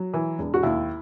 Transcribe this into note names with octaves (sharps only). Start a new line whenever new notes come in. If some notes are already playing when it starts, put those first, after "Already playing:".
Already playing: F#3
E3
E1
F#4
D#2 E4